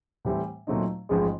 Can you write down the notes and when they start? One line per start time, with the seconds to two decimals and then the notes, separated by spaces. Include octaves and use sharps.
0.25 A2 E3 G3 C4 E4
0.67 A#2 F#3 A3 C4 D#4
1.09 A1 G#2 F3 G#3